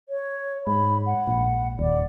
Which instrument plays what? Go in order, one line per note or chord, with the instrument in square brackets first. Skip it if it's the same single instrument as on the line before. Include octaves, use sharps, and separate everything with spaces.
[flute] C#5
[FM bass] G#2 [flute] B5
[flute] F#5
[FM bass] A#1
[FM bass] D#1 [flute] D5